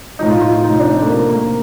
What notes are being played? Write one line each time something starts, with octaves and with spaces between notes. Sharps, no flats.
A2 F3 D#4
F4
F4
F4
C3 F3 D#4
D4
C4
A3
C3 F3 A#3
A#3